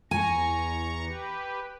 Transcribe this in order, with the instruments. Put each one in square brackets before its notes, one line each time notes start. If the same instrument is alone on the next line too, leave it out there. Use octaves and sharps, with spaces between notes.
[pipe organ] E2 A#5 C#6 [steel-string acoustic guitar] G#5
[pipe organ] G4 B4